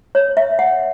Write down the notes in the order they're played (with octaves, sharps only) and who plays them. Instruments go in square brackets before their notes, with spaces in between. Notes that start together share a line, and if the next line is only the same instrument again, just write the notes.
[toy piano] C#5
E5
F#5